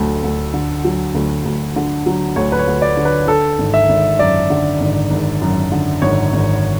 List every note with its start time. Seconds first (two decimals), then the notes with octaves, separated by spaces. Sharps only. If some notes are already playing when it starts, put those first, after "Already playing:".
Already playing: D2 F#3 A4
0.23 D2
0.54 D3
0.84 F#3
1.15 D2
1.45 D2
1.76 D3
2.06 F#3
2.36 D2 C#5
2.52 B4
2.59 C#5
2.67 D2
2.82 D5
2.97 D3
3.05 B4
3.27 D3 A4
3.58 G#1
3.74 E5
3.89 G#1
4.19 F#2 D5
4.50 D3
4.80 G#1
5.11 G#1
5.41 F#2
5.72 D3
6.02 G#1 C#5
6.33 G#1